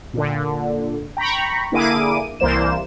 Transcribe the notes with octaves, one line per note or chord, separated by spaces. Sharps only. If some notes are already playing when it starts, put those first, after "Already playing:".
A#2 D3
G5 A#5 B5 C#6
D3 A#3 E4 G#4 D6 D#7
C2 E3 A#3 C5 D5 E7